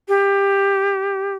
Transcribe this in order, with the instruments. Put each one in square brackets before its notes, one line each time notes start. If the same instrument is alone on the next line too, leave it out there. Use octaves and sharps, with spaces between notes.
[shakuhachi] G4